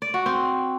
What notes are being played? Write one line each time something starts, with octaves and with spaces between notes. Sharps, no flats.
D5
F#4
C4